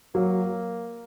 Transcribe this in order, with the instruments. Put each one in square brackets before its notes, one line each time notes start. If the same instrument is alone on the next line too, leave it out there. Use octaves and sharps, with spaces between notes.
[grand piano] F#3 [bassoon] A#3